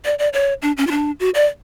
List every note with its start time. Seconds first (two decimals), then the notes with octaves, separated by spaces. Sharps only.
0.05 D5
0.19 D5
0.33 C#5
0.62 D4
0.77 C#4
0.87 F4
0.91 D4
1.20 F#4
1.34 D5